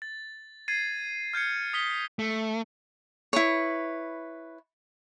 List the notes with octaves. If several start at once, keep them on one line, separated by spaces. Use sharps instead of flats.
A6
G#6 A6 C7 D#7
F6 G6 G#6 C#7
D#6 B6 G7
A3
E4 B4 C#5